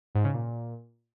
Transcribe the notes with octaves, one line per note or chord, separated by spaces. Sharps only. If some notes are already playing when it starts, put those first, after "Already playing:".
G#2
C#3
A#2